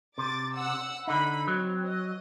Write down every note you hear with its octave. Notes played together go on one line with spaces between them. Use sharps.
C3 D6 A6
F#5 E6
D3 D#4 B5
F#3 C4
D#5